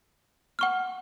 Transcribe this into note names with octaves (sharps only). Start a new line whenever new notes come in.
F#5 C#6 F6